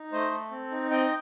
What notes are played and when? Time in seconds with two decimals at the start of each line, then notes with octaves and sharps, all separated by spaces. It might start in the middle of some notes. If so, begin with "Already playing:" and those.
Already playing: D#4
0.12 A3 C5 D#5
0.32 A4
0.51 C4
0.71 D#4
0.91 C4 D#5 G5